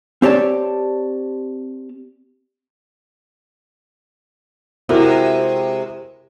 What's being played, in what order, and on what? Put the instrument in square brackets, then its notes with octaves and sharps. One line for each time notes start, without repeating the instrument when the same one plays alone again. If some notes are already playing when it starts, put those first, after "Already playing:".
[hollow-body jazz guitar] C4 G4 C#5 D5 A5
[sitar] C3 G#3 [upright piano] E4 F#4 A#4